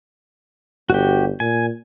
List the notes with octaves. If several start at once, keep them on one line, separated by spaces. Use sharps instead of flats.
G1 F#4 G4
A#2 G#5